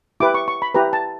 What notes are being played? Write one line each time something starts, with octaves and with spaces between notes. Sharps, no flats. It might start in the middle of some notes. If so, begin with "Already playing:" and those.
E4 G4 B4 D6
C#6
C#6
B5
E4 G4 B4 A#5
A5